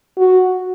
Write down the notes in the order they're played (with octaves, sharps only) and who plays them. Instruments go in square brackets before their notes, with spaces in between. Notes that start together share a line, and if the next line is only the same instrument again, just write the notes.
[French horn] F#4